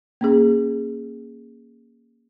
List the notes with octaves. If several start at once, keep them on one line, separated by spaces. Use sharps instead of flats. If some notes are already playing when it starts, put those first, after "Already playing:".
A#3 C#4 G#4